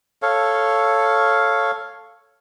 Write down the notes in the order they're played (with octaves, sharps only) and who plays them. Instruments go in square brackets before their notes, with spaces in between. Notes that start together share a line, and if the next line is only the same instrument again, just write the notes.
[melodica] A4 C#5 F5